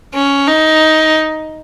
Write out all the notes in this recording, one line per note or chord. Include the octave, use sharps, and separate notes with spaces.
C#4
D#4